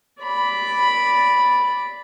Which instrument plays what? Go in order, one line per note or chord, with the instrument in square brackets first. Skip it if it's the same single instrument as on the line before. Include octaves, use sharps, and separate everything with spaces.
[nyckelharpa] D5 B5